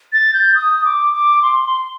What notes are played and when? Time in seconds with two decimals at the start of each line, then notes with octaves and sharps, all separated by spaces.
0.13 A6
0.34 G6
0.55 D#6
0.85 D6
1.14 D6
1.42 C6
1.64 C6